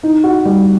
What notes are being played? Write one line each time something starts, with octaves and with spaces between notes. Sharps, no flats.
D#4
F#4
G3